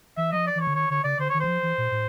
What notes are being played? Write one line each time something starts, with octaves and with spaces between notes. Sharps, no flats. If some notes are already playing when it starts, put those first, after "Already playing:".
E3 E5
F3 F#3 D#5
D5
E3 C#5
D3
D#3 C#5
D3 C#5
C#3 D5
D3 C5
D#3 C#5
E3 C5
F3
E3
A#2
A2